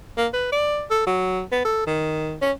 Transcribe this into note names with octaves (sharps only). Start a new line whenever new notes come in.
A#3
B4
D5
A4
F#3
B3
A4
D#3
C#4